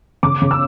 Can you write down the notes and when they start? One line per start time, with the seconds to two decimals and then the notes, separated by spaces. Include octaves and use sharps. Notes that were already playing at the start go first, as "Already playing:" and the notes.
0.23 C#3 D6
0.42 C#3
0.51 E6